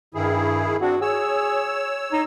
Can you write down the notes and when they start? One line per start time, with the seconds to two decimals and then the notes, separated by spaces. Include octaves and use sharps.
0.15 G2 D#3 E4 G#4
0.81 C4 D4 F#4
1.02 G#4 C#5 E6
2.13 D#4